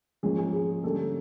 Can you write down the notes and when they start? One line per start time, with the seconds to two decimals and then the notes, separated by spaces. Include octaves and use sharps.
0.23 G#2 F3 A#3 C#4 G#4
0.38 G#4
0.53 G#4
0.83 D3 G3 A#3 C#4 A4